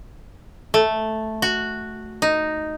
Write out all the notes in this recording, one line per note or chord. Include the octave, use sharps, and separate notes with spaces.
A3
F#4
D#4